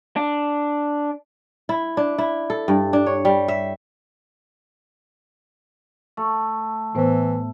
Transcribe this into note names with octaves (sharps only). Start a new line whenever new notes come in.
D4
E4
D4
E4
A4
G2
D4
C#5
G3
E5
A3
A2 E3 B3 C5